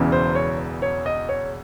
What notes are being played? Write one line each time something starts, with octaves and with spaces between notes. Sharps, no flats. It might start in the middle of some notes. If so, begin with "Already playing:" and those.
Already playing: E1 E2 C#3 E3
C5
C#5
C#5
D#5
C#5